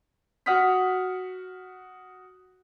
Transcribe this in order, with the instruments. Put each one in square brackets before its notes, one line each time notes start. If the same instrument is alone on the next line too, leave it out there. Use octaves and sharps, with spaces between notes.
[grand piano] F#4 F#5 D#6 F6 B6